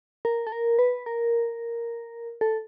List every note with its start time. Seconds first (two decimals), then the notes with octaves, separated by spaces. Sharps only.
0.25 A#4
0.47 A4
0.52 A#4
0.79 B4
1.06 A#4
2.41 A4